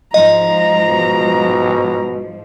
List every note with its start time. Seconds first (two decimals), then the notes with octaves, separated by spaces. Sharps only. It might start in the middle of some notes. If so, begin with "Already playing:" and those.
0.14 G#2 F3 D#5 A#5
0.89 B2